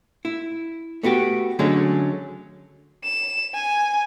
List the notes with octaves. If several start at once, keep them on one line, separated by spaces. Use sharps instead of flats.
E4
A3 B3 F#4 G4
D3 F#3 G#3 A3 C#4
E7
G#5